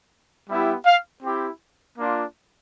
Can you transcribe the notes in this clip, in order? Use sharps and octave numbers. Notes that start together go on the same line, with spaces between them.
G3 B3 E4 G4
F5
C4 E4 G4
A#3 D4 F4